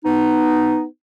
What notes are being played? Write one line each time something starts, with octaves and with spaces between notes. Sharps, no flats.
B3 D#4